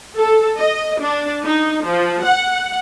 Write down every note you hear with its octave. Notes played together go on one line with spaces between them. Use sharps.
A4
D#5
D4
D#4
F3
F#5